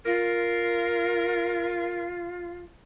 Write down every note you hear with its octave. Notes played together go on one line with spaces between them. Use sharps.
F4 A#4